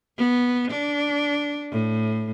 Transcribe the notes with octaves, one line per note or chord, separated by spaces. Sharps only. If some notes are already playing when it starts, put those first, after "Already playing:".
B3
D4
A2